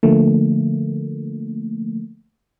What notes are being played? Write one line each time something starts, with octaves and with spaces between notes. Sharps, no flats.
D3 F3 A3 A#3